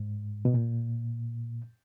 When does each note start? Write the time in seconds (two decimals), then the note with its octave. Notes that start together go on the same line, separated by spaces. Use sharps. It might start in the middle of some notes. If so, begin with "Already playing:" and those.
Already playing: G#2
0.45 B2
0.54 A#2